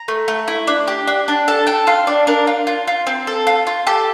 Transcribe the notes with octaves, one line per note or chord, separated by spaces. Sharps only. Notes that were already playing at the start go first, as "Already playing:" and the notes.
Already playing: A#5
A3
A3
E4
D4
G4
D4
D4
A4 A5
A4 G5
F4 F5
D4 D5
D4 A#4
F4
F4
F4
C4
A4
F4
F4
G4 A4